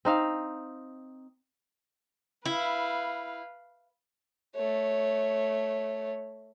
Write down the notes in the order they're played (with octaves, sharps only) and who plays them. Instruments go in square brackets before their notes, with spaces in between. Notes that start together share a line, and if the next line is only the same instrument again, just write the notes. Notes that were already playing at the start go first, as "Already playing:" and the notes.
[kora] C4 D#4 F5
[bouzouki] E4 [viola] B4 F5
[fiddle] A3 C#5